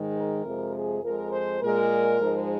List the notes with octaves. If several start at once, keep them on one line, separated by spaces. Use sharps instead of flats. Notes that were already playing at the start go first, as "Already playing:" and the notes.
Already playing: G#2 D#3 G#3
A#4
F2 C3 F3 G#3
G#4
F2 F3 G#3 A#4
C5
A#2 G#3 A#4
G#2 F3 G#3